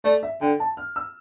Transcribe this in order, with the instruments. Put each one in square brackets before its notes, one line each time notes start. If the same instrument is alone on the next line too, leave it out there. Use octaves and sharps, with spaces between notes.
[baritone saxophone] A3 [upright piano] D5
[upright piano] E5
[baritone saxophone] D3 [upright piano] G5
[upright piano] A5
F6
E6